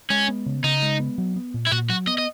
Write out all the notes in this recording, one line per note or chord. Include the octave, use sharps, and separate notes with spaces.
G#3 C#4
B3
C#3
C#3 D#4
G#3
B3
F#3
B3
A#2
E4
A#2 F#4
F#3 F#4
B3 D#5
D#5